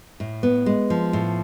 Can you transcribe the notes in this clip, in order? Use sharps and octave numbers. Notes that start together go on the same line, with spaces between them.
A2
B3
G#3
F3
A2